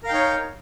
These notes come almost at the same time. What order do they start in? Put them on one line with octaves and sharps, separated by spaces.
A#4 F5 G5 D#4 C#5